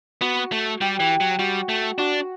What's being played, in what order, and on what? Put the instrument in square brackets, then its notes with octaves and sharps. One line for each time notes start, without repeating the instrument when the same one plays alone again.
[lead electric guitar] B3 [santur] F#4
[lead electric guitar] A3
[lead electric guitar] G3 [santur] G4
[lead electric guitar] E3
F#3
[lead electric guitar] G3 [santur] F#4
[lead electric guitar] A3
[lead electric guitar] D4 [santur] F#4